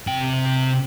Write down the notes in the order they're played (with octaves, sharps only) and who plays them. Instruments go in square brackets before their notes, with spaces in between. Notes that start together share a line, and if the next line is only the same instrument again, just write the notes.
[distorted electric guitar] C3 G5